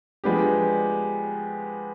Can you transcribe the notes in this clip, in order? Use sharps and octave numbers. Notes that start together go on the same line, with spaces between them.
F3 G#3 B3 D4 G4